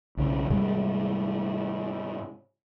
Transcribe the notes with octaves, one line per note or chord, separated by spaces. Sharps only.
B1 C#3
G#2 C3 G3 G#3